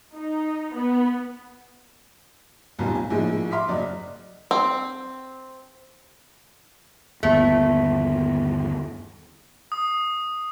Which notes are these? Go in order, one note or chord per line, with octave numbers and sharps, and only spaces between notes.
D#4
B3
F1 B1 F#2 D#3 G3 F4
G#5
A#1 A2 D#3 F3 G#3
E5 C6 D6 F6 B6
F#1 F#3 D5 D#5
C4
G1 D#2 A3 B3
D#6